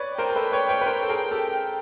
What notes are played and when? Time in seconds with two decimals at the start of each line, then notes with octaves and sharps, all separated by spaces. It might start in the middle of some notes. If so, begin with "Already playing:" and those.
Already playing: B4 C#5 D5
0.18 A#4 C5 G5
0.30 A#4
0.36 A4 B4
0.52 B4 C#5
0.69 B4 C#5
0.81 B4
0.86 A#4 C5
1.03 A4
1.09 G#4 A#4
1.31 G4 A4